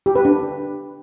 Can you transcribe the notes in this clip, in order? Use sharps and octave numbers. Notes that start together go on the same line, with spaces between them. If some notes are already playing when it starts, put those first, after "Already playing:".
G4
B4
D4